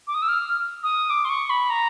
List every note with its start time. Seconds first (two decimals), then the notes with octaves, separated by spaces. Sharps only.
0.07 D6
0.14 D#6
0.22 E6
0.29 F6
0.83 D#6
1.10 D6
1.25 C6
1.29 C#6
1.50 B5
1.70 A#5